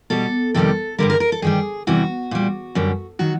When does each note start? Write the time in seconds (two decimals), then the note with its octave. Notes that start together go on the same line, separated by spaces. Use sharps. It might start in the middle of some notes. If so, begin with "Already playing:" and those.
0.10 B2 G3 A4
0.54 F2 C3 D#3 G3 A4
0.98 G2 D3 G3 A#4
1.10 A#4
1.20 A#4
1.32 A4
1.42 G2 D#3 G3 G#4
1.87 E2 C3 E3 G3 F#4
2.31 A#2 G3
2.75 F#2 D3 G3
3.19 D#3 F#3 F#4